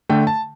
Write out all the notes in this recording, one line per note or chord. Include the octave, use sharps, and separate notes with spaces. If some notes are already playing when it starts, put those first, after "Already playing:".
D3 A3 G5
A5